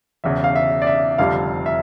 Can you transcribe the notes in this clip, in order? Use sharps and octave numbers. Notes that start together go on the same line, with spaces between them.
E1 E2 C#3 E5
F5
E5
D5
E5
F1 F2 D3 G3 F5
E5